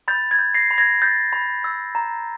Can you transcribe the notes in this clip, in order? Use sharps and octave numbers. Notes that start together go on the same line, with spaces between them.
B5 G6 A6
G#6
G6
A#6 C7
B5
G#6 A#6
G6 A6
B5
E6
A#5